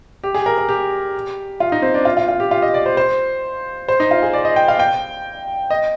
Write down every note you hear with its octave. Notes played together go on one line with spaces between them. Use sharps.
G4
G#4
A#4
A#4
G4
F4
D#4
C4
D4
F4
F4
F4
G4
F4
D#5
D5
C5
C5
C5
D#4
F4
G#4
D5
D#5
G5
F5
G5
D#5